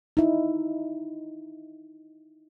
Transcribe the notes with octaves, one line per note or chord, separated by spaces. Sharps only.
D#4 E4